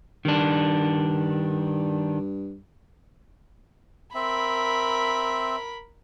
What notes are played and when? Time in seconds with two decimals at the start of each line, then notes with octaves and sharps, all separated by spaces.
0.25 G2 D#3 D4
4.15 C4 A#4 E5 B5